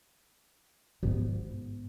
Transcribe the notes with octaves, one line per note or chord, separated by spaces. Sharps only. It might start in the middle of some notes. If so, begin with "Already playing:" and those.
G#2 B3